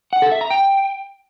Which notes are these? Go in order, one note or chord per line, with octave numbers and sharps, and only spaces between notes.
F#5
A4
E5
A#5
G5